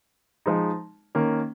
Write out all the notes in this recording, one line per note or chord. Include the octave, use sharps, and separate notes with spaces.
F3 G#3 D#4
D#3 A#3 C#4